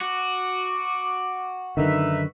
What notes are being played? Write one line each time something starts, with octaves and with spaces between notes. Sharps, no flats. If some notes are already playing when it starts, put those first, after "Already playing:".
F#4 D6
F#2 D3 D#3 D#4 B4 E5